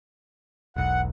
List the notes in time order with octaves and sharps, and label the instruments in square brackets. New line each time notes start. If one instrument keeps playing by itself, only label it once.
[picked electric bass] E1 B1 [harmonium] F#5